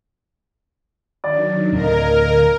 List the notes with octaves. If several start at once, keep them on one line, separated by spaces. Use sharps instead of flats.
D#3 F#3 D4 D5
D1 D2 D3 A#4 D#5 F5 G#6